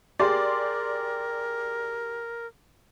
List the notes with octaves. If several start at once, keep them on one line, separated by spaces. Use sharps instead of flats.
G4 G#4 A#4 D5 C6